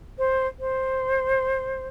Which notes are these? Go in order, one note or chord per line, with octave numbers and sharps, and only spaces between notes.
C5
C5